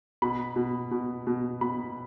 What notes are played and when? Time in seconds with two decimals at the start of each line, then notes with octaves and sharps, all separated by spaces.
0.22 B2 B5
0.56 B2
0.91 B2
1.27 B2
1.61 B2 B5